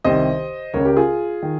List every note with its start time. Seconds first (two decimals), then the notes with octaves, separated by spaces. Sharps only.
0.05 C2 C3 D#3 C5 D#5
0.74 C#2 A#4 C#5
0.76 C#3
0.85 G4 A#4
0.97 F4 G#4
1.42 D#3